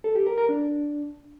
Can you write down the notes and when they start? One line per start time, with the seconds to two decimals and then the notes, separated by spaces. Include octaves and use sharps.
0.04 A4
0.15 G4
0.27 A#4
0.38 A#4
0.49 D4